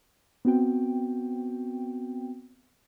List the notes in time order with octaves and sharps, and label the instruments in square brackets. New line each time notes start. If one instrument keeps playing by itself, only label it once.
[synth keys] B3 C4 F#4 G5